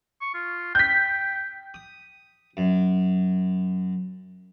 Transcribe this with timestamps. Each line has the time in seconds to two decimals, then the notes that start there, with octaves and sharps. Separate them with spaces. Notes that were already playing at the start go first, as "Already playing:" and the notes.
0.21 C#6
0.34 F4
0.75 G5 G6 B6
1.74 D#6
2.57 F#2